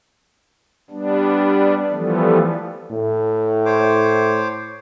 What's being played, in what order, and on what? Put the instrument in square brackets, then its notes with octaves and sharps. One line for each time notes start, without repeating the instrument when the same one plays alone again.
[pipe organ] G3 B3 D4
E3 F3 G3 A3 B3
[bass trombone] A2
[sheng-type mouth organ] C5 C#5 D6